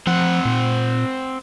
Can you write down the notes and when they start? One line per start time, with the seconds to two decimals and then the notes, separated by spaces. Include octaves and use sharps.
0.07 F3 C4 F#5
0.45 A#2